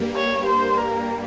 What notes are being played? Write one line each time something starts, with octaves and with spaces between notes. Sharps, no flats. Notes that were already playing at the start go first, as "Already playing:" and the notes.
Already playing: G2 G3 A#3
C#5
C5
A#4